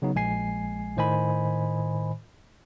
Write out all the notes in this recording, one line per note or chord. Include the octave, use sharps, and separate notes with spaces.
C#3 F#3 B3 D#4
A#1 G#3 G#5 C7
A2 D#3 C5 D#5 G#5 B5